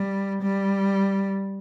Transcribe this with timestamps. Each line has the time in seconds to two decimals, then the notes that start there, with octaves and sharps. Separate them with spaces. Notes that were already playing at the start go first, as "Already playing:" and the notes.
Already playing: G3
0.42 G3